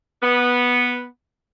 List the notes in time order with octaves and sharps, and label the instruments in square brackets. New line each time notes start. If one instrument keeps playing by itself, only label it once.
[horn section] B3